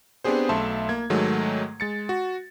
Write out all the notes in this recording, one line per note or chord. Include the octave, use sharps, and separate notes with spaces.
B3 C4 D4 G4 G#4 C5
B1 A3 E5 A5 C6
A#3 G#6
G#2 D#3 F#3 G#3 A3
G#3 A6 C#7
F#4